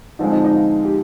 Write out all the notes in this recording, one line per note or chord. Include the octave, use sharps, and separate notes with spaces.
D3 F3 G#3 C4 D#4
D#4
D#4
F4
G4